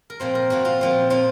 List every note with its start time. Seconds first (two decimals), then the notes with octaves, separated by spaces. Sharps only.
0.10 A#4
0.20 A#2 F3 C4 C5
0.35 A#4
0.50 A#2 F3 C4 F#4
0.65 F4
0.81 A#2 F3 C4
1.10 A#2 F3 C4 F4